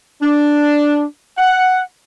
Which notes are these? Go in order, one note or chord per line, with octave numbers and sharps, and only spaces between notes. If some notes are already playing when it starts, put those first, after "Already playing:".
D4
F#5